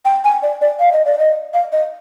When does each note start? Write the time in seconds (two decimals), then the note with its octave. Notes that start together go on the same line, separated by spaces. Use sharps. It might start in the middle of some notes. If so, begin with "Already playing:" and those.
0.05 G5
0.24 G#5
0.43 D5
0.61 D5
0.80 F5
0.92 D#5
1.05 D5
1.19 D#5
1.54 F5
1.72 D#5